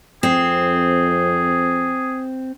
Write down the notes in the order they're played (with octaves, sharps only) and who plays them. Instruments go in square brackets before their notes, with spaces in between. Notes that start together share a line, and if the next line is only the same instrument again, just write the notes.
[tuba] F2 [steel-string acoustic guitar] C4 [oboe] G#4